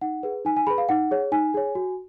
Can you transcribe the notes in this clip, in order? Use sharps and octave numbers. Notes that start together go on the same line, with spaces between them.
D#4 F#5
G#4 B4
D#4 G#5
G#5
G#4 B4 B5
F5
D#4 F#5
G#4 C#5
D#4 G#5
G#4 C#5
F#4